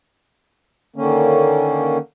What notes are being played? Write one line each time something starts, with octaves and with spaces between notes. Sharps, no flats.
D3 D#3 A#3 C#4